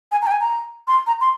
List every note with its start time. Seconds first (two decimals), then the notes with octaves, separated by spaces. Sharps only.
0.12 G#5
0.22 A#5
0.27 G5
0.32 G#5
0.40 A#5
0.88 C6
1.07 A#5
1.21 C6